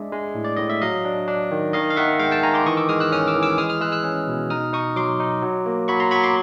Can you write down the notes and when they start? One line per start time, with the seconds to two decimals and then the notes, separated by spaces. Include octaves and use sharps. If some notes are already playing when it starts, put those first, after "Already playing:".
Already playing: G#3 D4 D5 E5
0.12 G#3
0.35 A2
0.44 D5
0.56 A2 D#5
0.69 E5
0.82 F#3 D#5 F5
1.05 D4
1.28 D4
1.51 D#3
1.73 D#3 D#5 F5
1.90 F5
1.96 D#3 E5 F#5
2.19 G#3 F5 G5
2.31 G5 A5
2.43 D#3 G#5 A#5
2.54 C6 D6
2.66 E3 C#6 D#6
2.77 D6 E6
2.89 G#3 D#6 F6
3.00 E6 F#6
3.12 C#4 D#6 F6
3.27 D6 E6
3.35 E3
3.43 D6 E6
3.58 G#3 D#6 F6
3.69 D#6 F6
3.81 G#3 E6 F#6
3.92 E6 F#6
4.04 C#4
4.28 B2
4.50 D#4 D#6 F6
4.73 D#4 C#6 D#6
4.96 F#3 C6 D6
5.20 D#4
5.42 F#3
5.66 A#3
5.88 F#3 B5 C#6
6.00 A#5 C6
6.11 F#3 B5 C#6
6.23 C6 D6